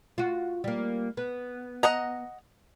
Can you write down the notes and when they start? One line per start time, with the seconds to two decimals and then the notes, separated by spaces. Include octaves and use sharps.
0.18 F4 F#4
0.64 G3 A#3
1.17 B3
1.83 D#5 F#5 A#5